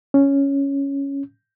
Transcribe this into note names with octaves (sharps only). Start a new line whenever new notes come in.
C#4